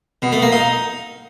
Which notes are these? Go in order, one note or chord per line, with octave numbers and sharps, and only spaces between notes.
B2
A3
A#3
D#4